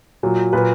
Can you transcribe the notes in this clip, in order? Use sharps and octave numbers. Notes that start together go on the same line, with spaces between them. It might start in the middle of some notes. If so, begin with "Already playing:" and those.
A#2 F#3
A#2 F#3 B4